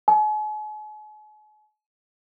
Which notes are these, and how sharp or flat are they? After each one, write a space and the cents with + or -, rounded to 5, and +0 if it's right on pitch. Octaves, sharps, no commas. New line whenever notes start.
G#5 +45